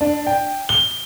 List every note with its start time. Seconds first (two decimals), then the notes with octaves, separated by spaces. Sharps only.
0.01 D4
0.27 G5
0.69 G7